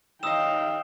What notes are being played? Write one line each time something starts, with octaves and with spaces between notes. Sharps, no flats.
D#2 D#4 D#5 F5 G5 D#6 E6 E7